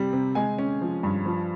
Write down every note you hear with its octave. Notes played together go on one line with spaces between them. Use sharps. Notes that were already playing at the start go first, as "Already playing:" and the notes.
Already playing: C3 G3 C4
C3
G#3 G#5
C#4
F3
G2
F3